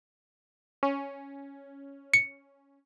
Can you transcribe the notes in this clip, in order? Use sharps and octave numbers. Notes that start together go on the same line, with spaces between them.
C#4
C#7